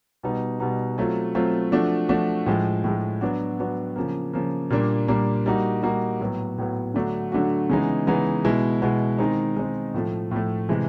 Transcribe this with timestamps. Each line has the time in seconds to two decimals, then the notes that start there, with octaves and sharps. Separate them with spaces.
0.23 B2 G3 B3 D#4
0.60 B2 G3 B3 D#4
0.98 F#3 A3 C4 F4
1.35 F#3 A3 C4 F4
1.72 F3 A3 D4 F#4
2.09 F3 A3 D4 F#4
2.46 A2 F3 G#3
2.84 A2 F3 G#3
3.21 F#3 B3 D4 F#4
3.59 F#3 B3 D4 F#4
3.96 C#3 F3 A#3
4.33 C#3 F3 A#3
4.70 A#2 G3 A#3 D4
5.08 A#2 G3 A#3 D4
5.46 G3 A#3 D#4 F#4
5.83 G3 A#3 D#4 F#4
6.20 A2 F#3 B3
6.58 A2 F#3 B3
6.94 D3 F#3 A3 D4 F#4
7.32 D3 F#3 A3 D4 F#4
7.69 C#3 E3 G#3 B3 D#4
8.07 C#3 E3 G#3 B3 D#4
8.44 B2 G#3 B3 E4
8.82 B2 G#3 B3 E4
9.18 D#3 G#3 C4 D#4
9.57 D#3 G#3 C4 D#4
9.94 A2 F3 A3
10.31 A2 F3 A3
10.69 C3 E3 G#3